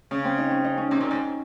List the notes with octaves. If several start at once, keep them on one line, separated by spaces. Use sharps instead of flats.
C#3 C#4
C4
D#4
C#4
D#4
C#4
C3 C#4
A#2
G#2